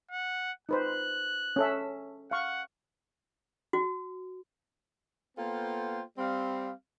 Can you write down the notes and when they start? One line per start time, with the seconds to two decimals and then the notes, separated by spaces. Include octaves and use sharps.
0.11 F#5
0.69 D#4 B4 C5 F#6
1.56 C#4 A4 E5
2.31 F5 F#5 C#6
3.73 F#4
5.38 A#3 B3 F4 A4 C5 G5
6.18 G3 C4 F5